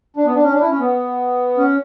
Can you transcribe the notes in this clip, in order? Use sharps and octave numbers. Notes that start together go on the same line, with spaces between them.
D4
B3
D4
C#4
D4
E4
C#4
B3
C#4